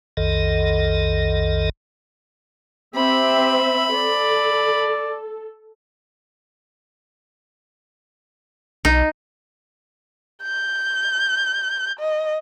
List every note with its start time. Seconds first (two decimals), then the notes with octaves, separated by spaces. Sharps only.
0.17 B1 F2 D#3 A4 D#5
2.95 C4 G4 E5 B5
3.94 A4 D5
8.85 B1 D#4
10.43 G6
12.00 D#5